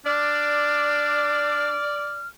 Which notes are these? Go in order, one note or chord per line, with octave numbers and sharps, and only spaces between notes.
D4 D5 F6